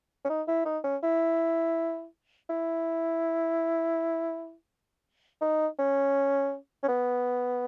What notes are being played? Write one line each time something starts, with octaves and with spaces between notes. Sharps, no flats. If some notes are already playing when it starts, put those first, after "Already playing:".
C#4
D#4
E4
D#4
C#4
E4
E4
D#4
C#4
C#4
B3